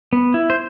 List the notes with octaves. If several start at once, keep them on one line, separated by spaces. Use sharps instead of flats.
B3
E4
C5